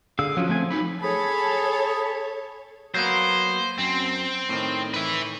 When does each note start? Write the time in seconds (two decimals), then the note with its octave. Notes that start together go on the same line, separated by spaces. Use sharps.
0.19 D3 G#4 F5 E6
0.37 F3 F#3 C#4 F4
0.49 A3 C4 G#5
0.70 F#3 D#4 B5
1.02 G#4 A4 C#5 B5
2.94 F#3 A#3 B3 C5
3.79 F#2 C4
4.49 A2 D#3
4.94 B4 E5